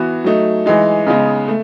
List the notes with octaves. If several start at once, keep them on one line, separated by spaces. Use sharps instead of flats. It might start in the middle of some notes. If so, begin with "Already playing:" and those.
Already playing: E3 B3 F#4
F#3 A3 D#4
E3 G#3 D#4
C#3 G#3 B3 D#4
A3